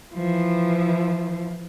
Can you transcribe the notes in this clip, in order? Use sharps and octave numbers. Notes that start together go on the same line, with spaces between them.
E3 F3